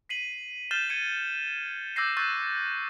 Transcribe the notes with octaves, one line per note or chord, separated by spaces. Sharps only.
B6 C7 D#7 F#7
F6 G6 A6 C7 E7 G7
G#6 C#7 D#7
D6 E6 G6 A#6 C7
C#6 E6 F#6 G6 A6 D#7